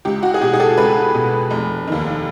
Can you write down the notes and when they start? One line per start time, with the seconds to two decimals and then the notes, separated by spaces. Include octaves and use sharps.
0.05 C#2 G4
0.23 F#4
0.34 G#4
0.41 B2 G4
0.53 G#4
0.59 G4 A4
0.78 C#2 A4 B4
1.14 B2
1.50 F1
1.87 D#2 D#3